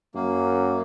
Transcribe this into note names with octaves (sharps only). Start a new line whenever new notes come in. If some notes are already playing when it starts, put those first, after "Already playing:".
F#2 A#3